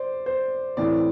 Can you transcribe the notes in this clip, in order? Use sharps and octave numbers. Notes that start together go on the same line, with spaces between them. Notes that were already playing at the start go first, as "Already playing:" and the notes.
Already playing: C5 D5
C5
A2 E3 A3 C4 D5